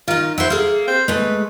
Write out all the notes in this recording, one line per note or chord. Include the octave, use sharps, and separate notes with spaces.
D#3 D#4 F4
E4 C5 E5 F#5
A#3 G#4 A4
C4
G#3 A3 B4